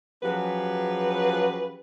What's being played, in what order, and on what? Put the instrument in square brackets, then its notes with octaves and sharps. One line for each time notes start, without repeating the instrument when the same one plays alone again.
[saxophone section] F3 F#3 C#4 G4 G#4 B4